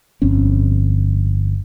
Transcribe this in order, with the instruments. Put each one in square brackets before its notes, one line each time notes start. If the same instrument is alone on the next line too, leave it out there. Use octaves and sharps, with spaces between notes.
[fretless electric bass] G1 F2 C4 C#4